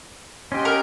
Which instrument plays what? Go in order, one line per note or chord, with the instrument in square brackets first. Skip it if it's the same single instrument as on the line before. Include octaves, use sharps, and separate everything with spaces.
[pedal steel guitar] C#4 G4 [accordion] F#4 D#5 C6
[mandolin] A#4